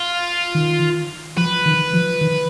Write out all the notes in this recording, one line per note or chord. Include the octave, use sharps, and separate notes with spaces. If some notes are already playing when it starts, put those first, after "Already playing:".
Already playing: F4
D#3
F3 B4
D#3
F3
D#3